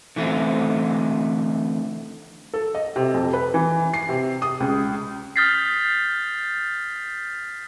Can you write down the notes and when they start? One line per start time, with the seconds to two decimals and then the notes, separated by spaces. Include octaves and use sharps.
0.16 D3 E3 A3 C4
2.54 A4
2.75 D#5
2.96 C3
3.14 F2
3.33 B4
3.54 E3
3.94 C7
4.09 C3
4.42 D#6
4.60 C#2
5.36 D#6 F6 G6 A6 B6 C7